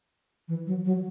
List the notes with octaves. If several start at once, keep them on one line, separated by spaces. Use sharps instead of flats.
E3
F#3
F#3